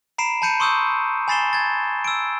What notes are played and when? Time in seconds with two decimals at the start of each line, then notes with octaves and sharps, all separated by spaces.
0.18 A#5 B5 C7 D7 E7
0.42 A5 B5 G6 C#7 D#7
0.60 C6 C#6 D#6 E6 G6
1.28 G#5 B5 A6 C7 E7 G7
1.53 G#6 A6
2.04 E6 D7